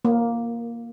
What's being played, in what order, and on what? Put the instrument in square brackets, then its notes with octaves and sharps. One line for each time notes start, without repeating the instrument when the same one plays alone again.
[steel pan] A#3